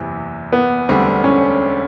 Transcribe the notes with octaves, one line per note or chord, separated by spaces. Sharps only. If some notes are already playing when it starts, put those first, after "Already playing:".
Already playing: F#1 E2 C3 E3
B3
E1 D2 D3 G3 C4
C#4